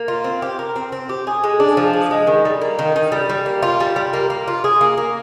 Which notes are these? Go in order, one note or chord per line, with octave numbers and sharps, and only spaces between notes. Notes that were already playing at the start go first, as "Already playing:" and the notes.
Already playing: A#3
F4
C4
G4
A#4
C4
C4
G4
G#4
G#3
D4
F3
G#4
G#3
D#3
G3
A#3
D#3
D#3
G3
G3
A#3
F4
G3
G3
A#3
A#3
F4
G#4
A#3
A#3